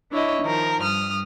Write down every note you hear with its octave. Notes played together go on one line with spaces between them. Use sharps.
D4 E4 C#5 D#5
D#3 F3 A#4
G2 D#6 F6